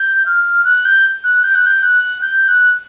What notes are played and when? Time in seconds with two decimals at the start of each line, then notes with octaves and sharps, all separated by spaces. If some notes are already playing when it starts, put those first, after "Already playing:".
Already playing: G6
0.26 F6
0.65 F#6
0.85 G6
1.24 F#6
1.44 G6
1.55 F#6
1.66 G6
1.83 F#6
2.22 G6
2.48 F#6